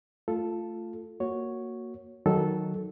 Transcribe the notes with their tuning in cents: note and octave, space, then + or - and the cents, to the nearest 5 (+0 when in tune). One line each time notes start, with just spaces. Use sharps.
A3 +5 F4 -5 A4 +0
A#3 +0 F#4 -5 C#5 +0
D#3 +0 F#3 +0 A4 -10